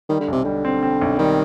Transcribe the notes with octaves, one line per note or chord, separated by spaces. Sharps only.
D#3 G3
D3
B1 C3
D3 G3
C4
C4
B1
D#3 G3